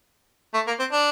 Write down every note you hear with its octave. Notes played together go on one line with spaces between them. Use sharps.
A3
A#3
C4
D4